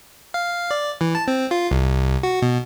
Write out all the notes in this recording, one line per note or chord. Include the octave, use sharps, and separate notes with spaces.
F5
D5
E3
A5
C4
F4
C2
F#4
B2